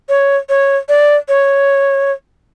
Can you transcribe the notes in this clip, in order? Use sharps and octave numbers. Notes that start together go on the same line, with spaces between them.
C#5
C#5
D5
C#5